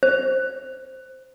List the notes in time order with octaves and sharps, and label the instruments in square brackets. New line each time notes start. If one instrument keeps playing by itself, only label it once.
[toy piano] C5